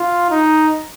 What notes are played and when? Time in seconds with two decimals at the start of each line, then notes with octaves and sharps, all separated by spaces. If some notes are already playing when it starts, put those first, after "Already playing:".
Already playing: F4
0.31 D#4